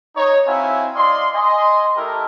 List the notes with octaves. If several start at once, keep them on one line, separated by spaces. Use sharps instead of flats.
D#4 C#5
C4 E4 F#4 E5 F5 G#5
D5 D#5 F5 C6
D#5 G#5 C6
A3 E4 G4 A4 A#4